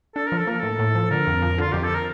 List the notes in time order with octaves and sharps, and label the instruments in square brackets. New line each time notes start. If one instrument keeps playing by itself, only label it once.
[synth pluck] D4 [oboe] A4
[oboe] A#4
[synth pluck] F3
[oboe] A4
[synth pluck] A#3 [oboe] A#4
[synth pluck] A2 [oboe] A4
[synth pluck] A2
F3
[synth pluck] D3 [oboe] A#4
[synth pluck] F2
F3
[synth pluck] D3 [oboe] F4
[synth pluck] F2 [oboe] G4
[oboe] A4
A#4